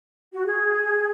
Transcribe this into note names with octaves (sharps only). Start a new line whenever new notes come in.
F#4
G#4